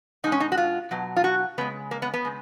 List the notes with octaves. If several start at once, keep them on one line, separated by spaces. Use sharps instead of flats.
B2 G#3 D#4
C#4
D#4
F#4
F4
B2 F#3
F4
F#4
C#3 G#3 B3
A#3
B3
B3
C#3 G#3